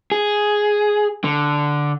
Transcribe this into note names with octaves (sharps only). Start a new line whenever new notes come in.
G#4
D3